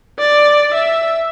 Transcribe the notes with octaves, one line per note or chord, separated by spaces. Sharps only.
D5
E5